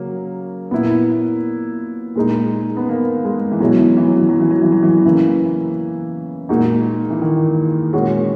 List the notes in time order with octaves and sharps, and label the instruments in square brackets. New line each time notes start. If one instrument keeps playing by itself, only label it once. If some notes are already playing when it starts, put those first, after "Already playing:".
Already playing: [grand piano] C#3 F#3 C#4 [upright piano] A#3
[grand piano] A#2 A#3 E4 [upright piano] B3
[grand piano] A#2 G#3 D#4
[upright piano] B3
A#3
G#3
E3
[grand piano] B2 G#3 C#4 E4 [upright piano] F#3
[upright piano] E3
F#3
E3
F#3
E3
F#3
E3
F#3
E3
[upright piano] C#3 [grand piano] E3 A#3 E4
[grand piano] A#2 G#3 D#4 F#4
[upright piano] E3
D#3
[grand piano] A#2 G#3 C#4 F#4